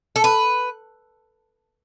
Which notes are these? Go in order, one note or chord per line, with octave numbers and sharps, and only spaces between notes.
A4
B4